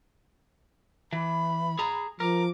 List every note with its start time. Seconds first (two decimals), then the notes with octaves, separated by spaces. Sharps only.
1.13 E3 B5
1.79 G#4 A#5
2.20 F3 A#4 D6